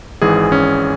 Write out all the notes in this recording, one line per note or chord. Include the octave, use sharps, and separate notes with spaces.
G#1 G#2 E3 G#4
C#4